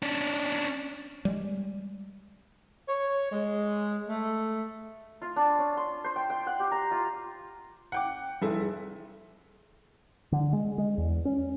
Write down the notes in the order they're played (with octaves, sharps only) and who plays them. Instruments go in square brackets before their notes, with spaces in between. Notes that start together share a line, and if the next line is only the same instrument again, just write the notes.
[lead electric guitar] C#4 D4
[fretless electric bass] G3 G#3
[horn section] C#5
G#3
A3
[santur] F4
D4
C#4
C6
C5
G5
G5
F#5
G4
A#5
F4
[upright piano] F#5 G5 D6
[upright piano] F1 E4 E5 [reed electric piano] G3 G#4 A4
[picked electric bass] D3
G#3
G#3
E2
C#4